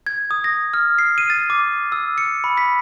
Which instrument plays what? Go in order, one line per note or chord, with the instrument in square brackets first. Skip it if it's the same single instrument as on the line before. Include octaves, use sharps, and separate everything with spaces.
[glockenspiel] G#6
D#6
A#6
F6
C7
D#7
A6
D6
E6
C#7
B5
B6